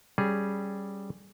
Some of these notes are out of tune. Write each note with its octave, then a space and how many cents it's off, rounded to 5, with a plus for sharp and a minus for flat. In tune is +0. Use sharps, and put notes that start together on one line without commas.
G3 +0 C#4 +0 G#4 +0